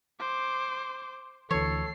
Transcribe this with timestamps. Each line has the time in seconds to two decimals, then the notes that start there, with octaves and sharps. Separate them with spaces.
0.20 C5 D6
1.51 D2 E3 A4 C#5 C7